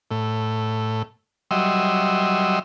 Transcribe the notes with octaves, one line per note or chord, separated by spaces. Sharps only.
A2
F#3 G3 D#5 E5 C6